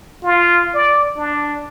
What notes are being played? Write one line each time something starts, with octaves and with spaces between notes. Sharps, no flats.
F4
D5
D4